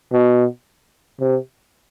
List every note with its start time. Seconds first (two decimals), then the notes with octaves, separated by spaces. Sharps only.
0.13 B2
1.20 C3